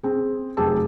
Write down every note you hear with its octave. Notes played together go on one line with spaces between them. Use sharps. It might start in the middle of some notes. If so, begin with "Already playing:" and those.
C4 G#4
F1 F#2 G4 G#4 A5 E6